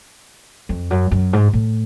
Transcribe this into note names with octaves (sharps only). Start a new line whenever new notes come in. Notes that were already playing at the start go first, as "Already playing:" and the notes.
F2
F#2
F#2
G#2
A2